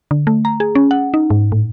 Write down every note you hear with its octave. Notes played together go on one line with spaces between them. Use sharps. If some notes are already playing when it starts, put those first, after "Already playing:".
D3
A3
A#5
G#4
C#4
F#5
D#4
G#2
A2